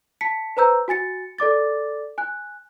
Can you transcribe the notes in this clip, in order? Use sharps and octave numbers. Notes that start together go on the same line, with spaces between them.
A5 B6 C#7
B4 C5 A#5 E6 G6
F#4 G#5 A6 C#7
A4 D5 D6 A6
G#5 F#6